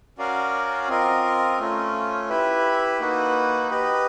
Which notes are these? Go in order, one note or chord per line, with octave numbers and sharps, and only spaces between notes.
C#4 F#4 A#4 D5 F5
C4 F4 A#4 D#5
A3 C#4 F4
E4 G4 B4 E5
A#3 D#4 F#4 B4
G4 B4 D#5